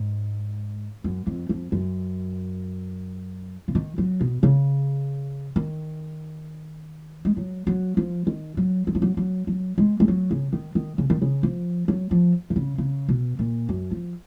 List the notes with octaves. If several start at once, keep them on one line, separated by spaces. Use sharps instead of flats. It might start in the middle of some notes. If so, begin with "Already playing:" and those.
Already playing: G#2
F#2
F2
F2
F#2
C#3
D#3
F#3
B2
C#3
D#3
G#3
F#3
F#3
F3
D#3
F#3
F#3
F3
F#3
F#3
F#3
G#3
G#3
F#3
C#3
D#3
D#3
C#3
D#3
C#3
F3
F#3
F3
D#3
C#3
C#3
B2
A#2
F#2
F3